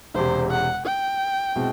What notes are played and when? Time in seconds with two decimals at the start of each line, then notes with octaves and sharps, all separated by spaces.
0.15 E1 E2 C3 C5
0.51 F#5
0.86 G5
1.56 B2 G#3 C4 E4